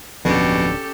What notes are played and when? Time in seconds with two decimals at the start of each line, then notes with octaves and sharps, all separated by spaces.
0.25 D1 F2 B2 D3 C#4 G4 A4